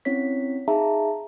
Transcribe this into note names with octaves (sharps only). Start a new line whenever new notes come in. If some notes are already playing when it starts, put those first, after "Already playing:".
C4 C#4 E4 C#5 B6
D#4 G#4 E5 F5 A5 A#5